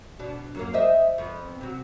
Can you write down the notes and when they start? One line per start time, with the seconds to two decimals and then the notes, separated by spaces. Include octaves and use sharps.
0.19 B2 D4
0.55 F#2 F#3 A#3
0.74 C5 D#5 E5
1.18 F2 B3
1.61 C3 F#3